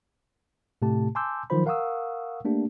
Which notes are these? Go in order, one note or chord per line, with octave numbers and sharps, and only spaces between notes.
A2 C3 A3 G4 A5
G#5 A5 C6 D6 E6 G6
D#3 F3 F#3 F4 C5 B5
A#4 F5 F#5 C#6 D#6 E6
A3 A#3 D4 G4